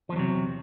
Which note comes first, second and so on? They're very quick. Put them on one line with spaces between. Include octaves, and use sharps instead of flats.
F3 E2 F#3 C3